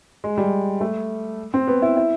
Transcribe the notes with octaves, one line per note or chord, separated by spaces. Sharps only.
G#3
G3
A3
C4
B3
E4
E4